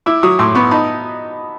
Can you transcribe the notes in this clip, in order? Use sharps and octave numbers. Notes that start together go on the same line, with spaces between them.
E4 D6 E6
F#3 C#6 D#6
A2 C6 D6
B3 B5 C#6
D#4 A5 B5